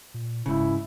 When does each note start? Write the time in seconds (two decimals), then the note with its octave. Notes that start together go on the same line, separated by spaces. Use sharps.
0.14 A#2
0.46 D1 G#2 C#3 E4